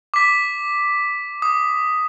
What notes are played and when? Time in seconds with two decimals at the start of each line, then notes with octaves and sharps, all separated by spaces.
0.14 D6 B6
1.42 D#6